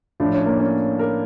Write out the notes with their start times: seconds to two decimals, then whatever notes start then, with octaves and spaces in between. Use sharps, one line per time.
0.20 A2 F3 D4
0.34 C#4
0.46 A#3
0.60 C#4
0.99 A#4